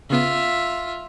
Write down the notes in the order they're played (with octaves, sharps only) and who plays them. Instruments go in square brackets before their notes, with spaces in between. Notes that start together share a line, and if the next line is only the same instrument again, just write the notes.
[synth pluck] C#3 B3 [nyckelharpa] F4 E5